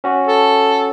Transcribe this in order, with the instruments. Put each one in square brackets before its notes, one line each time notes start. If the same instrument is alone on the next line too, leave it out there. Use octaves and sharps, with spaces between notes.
[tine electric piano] C#4 F#4
[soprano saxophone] A4